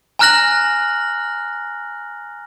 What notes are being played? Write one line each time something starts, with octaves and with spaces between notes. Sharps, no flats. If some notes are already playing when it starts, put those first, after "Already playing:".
G#5 A#5 F6 F#6 A#6 F#7